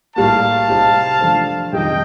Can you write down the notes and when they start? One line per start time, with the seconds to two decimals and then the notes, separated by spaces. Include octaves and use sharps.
0.16 A2 G3 A#3 F5 A5
0.68 C3 G3 C4 D#4 G4
1.21 F3 A3 D4 A4 C5
1.72 F2 C3 D#3 G3 D#5 G5